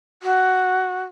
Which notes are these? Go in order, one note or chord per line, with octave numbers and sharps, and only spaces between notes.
F#4